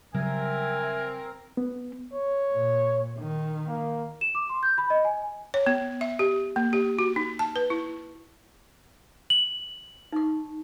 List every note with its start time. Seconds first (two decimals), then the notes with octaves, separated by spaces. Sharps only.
0.14 C#3 F#3 G3 C4 A#4 E5 G#5
1.57 B3
2.13 C#5
2.52 A#2
3.19 D#3
3.68 A#3
4.21 E7
4.35 D6
4.50 C6
4.63 G6
4.78 B5
4.90 D#5
5.05 G#5
5.54 C#5
5.66 B3
6.01 E5
6.19 G4
6.56 A#3
6.73 G4
6.99 F#4
7.16 D#4
7.39 A5
7.56 B4
7.70 E4
9.30 F#7
10.12 D#4 C#6